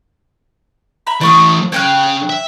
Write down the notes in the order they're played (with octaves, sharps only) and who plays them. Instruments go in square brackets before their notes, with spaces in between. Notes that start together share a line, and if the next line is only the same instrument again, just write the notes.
[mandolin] E5 A#5 B5
[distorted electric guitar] E3 A3 [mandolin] D5 C#6 D#6
[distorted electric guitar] C#3 [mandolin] C#5 G5 F#6
[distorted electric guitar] E5